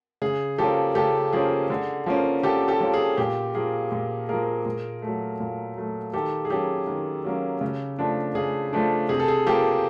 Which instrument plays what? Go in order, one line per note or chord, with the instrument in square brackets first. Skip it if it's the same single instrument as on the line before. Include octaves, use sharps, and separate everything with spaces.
[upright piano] C#3 G#4
F3 A#3 C#4 G4 A4
C#3 G4 A4
F3 A#3 C#4 G#4
D3
F3 A#3 C#4
D3 G4 A4
G4 A4
F3 A#3 C#4
G#4
A#2 G4
F3 A#3 G#4
A#2
F3 A#3 G#4 A#4
A#2
F#3 A3
A#2
F#3 A3
D#3 G4 A4
G#4
F#3 A#3 C#4 G4 A4
D#3
F#3 A#3 C#4
C#3
F3 A3 D4
C#3 G#4
F3 A3 D4
C3 G#4
A4
G#4
F3 A#3 G4 A4